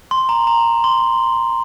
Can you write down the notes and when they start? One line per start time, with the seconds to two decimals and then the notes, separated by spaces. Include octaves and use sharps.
0.11 C6
0.29 A#5
0.47 A#5
0.84 C6